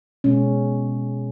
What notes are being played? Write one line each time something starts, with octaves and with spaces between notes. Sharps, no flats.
B2 G#3 C#4